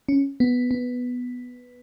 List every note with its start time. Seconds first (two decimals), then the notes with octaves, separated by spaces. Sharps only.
0.09 C#4
0.40 B3
0.71 B3